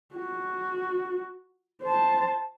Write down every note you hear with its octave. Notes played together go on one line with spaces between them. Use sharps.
F#4
C5 A5